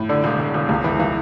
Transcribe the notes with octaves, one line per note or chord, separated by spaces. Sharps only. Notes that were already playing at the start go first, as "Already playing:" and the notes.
Already playing: A2
D3 D5
E1
E1
E1
C#2
E3
E3